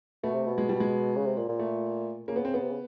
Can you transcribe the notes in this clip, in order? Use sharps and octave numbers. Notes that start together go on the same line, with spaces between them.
B2 A3
C3
B2
G#3
G3
G#3
C#3
C3
A#2
A#2
A3
C#3 A#3
B3
C4
B3
C3
C#3